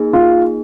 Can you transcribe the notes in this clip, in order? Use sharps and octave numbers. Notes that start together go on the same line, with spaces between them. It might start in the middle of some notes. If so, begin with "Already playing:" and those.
Already playing: A#3 D#4 G#4
F4